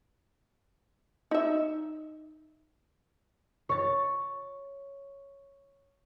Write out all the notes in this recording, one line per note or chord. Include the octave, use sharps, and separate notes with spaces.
D#4 E5
C#5 A6